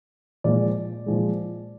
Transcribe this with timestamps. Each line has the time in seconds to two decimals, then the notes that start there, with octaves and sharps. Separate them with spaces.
0.44 A#2 F3 G#3 D5
1.06 A#2 F3 G#3